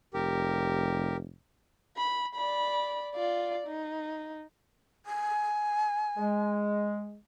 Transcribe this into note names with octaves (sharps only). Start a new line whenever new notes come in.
F1 G4 A#4
B5
D5 B5
F4 D5
D#4
G#5
G#3